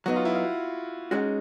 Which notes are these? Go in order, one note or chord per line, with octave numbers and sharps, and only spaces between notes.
F#3 B3 D#4 F#4
F4
E4
F4
G#3 C#4 D#4 F#4